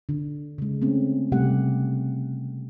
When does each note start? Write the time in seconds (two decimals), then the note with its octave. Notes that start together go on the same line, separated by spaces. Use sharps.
0.09 D3
0.58 C#3 G#3
0.82 A3 C4 C#4
1.32 C3 G3 A3 G4 F#5